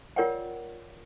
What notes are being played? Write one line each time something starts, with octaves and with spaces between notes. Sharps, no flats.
F4 A#4 C#5 D5 F#5 G5